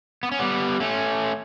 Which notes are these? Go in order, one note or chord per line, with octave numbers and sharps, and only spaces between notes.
B3
C#4
G3 B3
A3 C#4